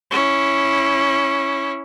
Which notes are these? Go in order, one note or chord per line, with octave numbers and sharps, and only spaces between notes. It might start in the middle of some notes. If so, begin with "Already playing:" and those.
C#4 E4